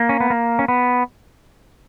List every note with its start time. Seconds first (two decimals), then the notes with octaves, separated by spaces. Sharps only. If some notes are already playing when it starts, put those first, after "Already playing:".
Already playing: A#3
0.09 C#4
0.20 B3
0.30 A#3
0.59 C#4
0.68 B3